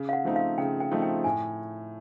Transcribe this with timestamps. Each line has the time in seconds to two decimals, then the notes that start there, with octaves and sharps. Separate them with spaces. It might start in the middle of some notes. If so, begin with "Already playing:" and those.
Already playing: C#3
0.09 F5
0.13 F#5
0.24 F3 A3 C4 D#4
0.36 F5
0.58 C#3 G5
0.80 G5
0.91 F3 A3 C4 D#4
1.02 G5
1.24 A2 G#5